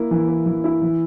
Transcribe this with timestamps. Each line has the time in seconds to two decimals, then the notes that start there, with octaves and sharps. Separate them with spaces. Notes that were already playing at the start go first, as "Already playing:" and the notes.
Already playing: A#3 E4
0.11 E3
0.29 A#3
0.46 E3
0.64 E4
0.82 E3